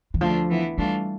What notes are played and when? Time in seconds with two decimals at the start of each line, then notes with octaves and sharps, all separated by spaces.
0.14 E3
0.21 D2 D3 F3 A3 D4 F4
0.49 E3 B3 E4
0.77 E3 G3 A3 D4 F4